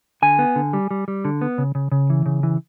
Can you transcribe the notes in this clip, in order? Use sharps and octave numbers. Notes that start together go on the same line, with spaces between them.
D3 G#5
B3
D3
G3
G3
G3
D3
B3
C#3
C#3
C#3
E3
C#3
E3